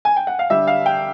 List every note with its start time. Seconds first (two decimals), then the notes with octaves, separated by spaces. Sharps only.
0.05 G#5
0.16 G5
0.27 F#5
0.39 F5
0.50 D3 G3 E5
0.67 F5
0.86 G5